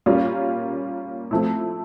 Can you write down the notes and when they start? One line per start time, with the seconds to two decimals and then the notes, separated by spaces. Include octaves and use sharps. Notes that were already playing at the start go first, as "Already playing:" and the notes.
0.06 A#2 G3 A#3 C#4 F4
1.31 F3 A3 C4 E4